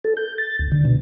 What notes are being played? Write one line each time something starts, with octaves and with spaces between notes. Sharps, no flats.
A4
G6
A6
D2
D3
B2